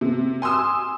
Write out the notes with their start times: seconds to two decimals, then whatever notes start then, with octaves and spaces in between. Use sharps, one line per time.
0.01 C3
0.42 G#5 C6 D#6 E6